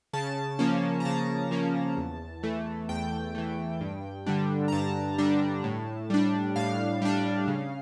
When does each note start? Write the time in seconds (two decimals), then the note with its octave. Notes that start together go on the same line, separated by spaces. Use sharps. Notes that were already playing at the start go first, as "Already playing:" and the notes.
0.13 C#3 A5
0.59 F3 A#3 C#4
1.00 A#5
1.05 C#3 A5
1.51 F3 A#3 C#4
1.97 E2
2.43 E3 A3
2.89 E2 G5
3.35 E3 A3
3.81 G2
4.26 D3 G3 D4
4.68 A#5
4.72 G2 A5
5.18 D3 G3 D4
5.64 A2
6.10 G3 D4
6.56 A2 F5
7.02 G3 D4
7.48 C#3